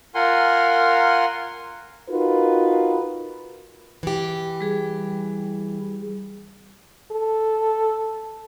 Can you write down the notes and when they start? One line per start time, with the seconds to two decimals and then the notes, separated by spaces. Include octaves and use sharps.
0.15 F4 A#4 F#5 G#5 C6
2.10 D#4 F4 F#4 A#4 B4
4.03 E3 G4
4.61 G3 G#4
7.11 A4